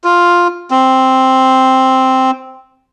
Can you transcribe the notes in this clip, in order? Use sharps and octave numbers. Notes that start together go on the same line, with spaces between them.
F4
C4